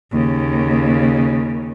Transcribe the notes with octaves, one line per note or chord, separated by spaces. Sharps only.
D#2 C#3